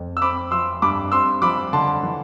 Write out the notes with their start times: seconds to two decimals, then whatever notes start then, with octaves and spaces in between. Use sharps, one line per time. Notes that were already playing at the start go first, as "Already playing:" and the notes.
Already playing: F2
0.17 E6
0.21 C4 B5 D6
0.51 F3 C6 E6
0.82 G2 B5 D6
1.12 C4 C6 E6
1.42 F3 B5 D6
1.73 D3 A5 C6
2.03 E3